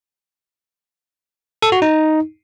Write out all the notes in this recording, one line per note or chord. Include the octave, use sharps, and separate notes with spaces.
A4
F#4
D#4